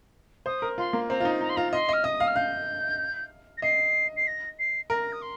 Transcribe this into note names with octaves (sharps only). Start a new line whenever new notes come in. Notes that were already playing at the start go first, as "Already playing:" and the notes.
C5 D#6
A#4
F4 C6
A#3
C4 A#5
F4
D#4
D#4 A#5
C6
F4 A#5
D#5 C6
D#5 F6
D#5 D#6
F5
F6
F5 G6
A#6
D#5 C7
C7
A#6
C7
A#4 A#6
D#6
C6